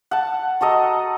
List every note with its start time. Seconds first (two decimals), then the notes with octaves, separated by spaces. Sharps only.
0.11 F#5 A5
0.61 F#4 A4 D#5 A#5